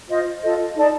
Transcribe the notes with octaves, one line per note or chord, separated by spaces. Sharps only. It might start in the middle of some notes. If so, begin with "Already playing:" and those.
F4 C5 D#5
F4 A4 D#5
D#4 A4 D5 A5